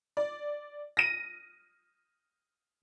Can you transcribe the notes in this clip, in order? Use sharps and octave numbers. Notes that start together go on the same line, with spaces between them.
D5
A#6 D#7